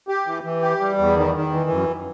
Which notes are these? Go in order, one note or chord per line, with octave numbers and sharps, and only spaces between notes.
G4
E3
E3
G4
G3
E2
D#3
D#3
E3
F#2